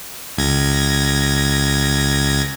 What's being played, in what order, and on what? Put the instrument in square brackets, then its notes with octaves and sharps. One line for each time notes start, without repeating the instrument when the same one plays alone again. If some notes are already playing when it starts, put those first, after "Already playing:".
[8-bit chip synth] C#2 G#6 A#6